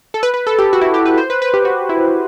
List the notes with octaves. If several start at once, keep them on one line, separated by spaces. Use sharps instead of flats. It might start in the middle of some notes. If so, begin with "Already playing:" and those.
A4
B4
B4
A4
G4
F#4
E4
G4
B4
C5
B4
B4
G4
F#4
E4